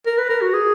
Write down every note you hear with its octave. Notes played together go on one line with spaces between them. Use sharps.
A#4
B4
A#4
F#4
G#4